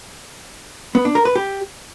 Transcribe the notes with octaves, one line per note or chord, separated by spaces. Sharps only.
B3
D4
A#4
B4
G4